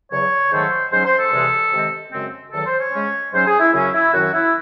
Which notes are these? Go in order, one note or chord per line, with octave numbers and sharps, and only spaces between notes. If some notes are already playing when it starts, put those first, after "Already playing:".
E2 C#3 F#3 C#5
G#2 D#3 F#3 A3 C5
G#2 F#3 C#4 C5
C5
A4
E2 C3 E3 G#3
C3 D#3 G#3 C4
F#2 C#3 G#3 C4
E2 D#3 F#3 A4
C5
C#5
C#3 G#3 C#4
G#2 F#3 C#4 C5
G#4
E4
F#2 C#3 F#3 C#4 E4
E4
F#2 D#3 F#3 F#4
E4